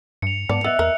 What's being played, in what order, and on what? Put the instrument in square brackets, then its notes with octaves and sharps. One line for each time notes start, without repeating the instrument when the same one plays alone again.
[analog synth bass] G2 [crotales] C#7 F7
[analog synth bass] G#2 [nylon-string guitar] B3 A5 [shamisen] D5
[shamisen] B3 [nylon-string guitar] D#5 E5 [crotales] E6 F#6
[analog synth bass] E2 [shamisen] A#4